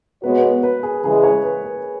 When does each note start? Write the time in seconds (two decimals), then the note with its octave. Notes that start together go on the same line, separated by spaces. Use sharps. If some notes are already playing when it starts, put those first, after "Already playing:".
0.23 B2 G#3 B3 F#4 B4 C#5
0.43 B4
0.63 B4
0.83 G#4
1.04 C#3 E3 G#3 G#4
1.24 C#5
1.44 B4
1.64 B4